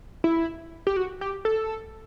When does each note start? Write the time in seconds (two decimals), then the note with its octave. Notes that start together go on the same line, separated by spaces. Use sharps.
0.24 E4
0.87 G4
0.97 F#4
1.21 G4
1.45 A4